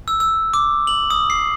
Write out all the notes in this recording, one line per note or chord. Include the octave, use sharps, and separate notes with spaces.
E6
E6
D6
F#7
D#6
C7